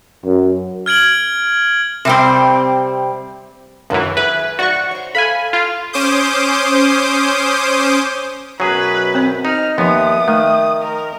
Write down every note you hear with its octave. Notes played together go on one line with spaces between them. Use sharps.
F#2
F6 G#6 D7 F#7
C3 G3 C4
C#2 F#2 C3 D#3 E3 D4
G#4 B4 E5
G#2 F3 F#4 D5 C#6
C5 C#5
A4 F5 G#5 B5
F4
C#4 C5 D6 D#6 G6
F#2 B2 F#3 G#4 B4
C4 C5
D#4 F6
D#2 F3 B3 E5 C6 D#6
D#3 A3
A#4